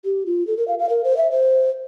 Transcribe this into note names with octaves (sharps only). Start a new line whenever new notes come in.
G4
F4
A4
A#4
F5
F5
A#4
C5
E5
C5